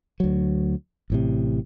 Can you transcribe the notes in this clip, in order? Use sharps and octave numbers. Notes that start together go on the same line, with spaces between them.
D2 F#3
A1 A2 C3